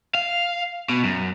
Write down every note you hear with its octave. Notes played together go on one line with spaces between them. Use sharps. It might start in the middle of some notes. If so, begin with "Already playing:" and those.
F5
B2
F#2